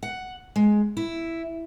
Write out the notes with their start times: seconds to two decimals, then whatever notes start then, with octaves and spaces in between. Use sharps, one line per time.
0.03 F#5
0.56 G#3
0.97 E4